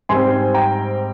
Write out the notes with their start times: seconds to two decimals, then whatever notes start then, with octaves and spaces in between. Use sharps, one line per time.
0.09 G#2 G3 C4 G#5 C6
0.54 G5 A#5